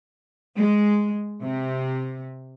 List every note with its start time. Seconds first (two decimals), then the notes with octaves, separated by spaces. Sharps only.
0.56 G#3
1.43 C3